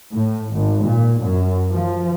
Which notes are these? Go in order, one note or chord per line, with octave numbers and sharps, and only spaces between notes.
A2
G#1
A#2
F#2
F3